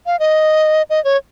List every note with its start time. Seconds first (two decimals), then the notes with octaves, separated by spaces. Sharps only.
0.06 F5
0.19 D#5
0.90 D#5
1.04 C#5